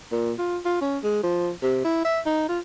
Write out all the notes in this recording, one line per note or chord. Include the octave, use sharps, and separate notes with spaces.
A#2
F4
F4
C#4
G#3
F3
C3
E4
E5
D#4
F4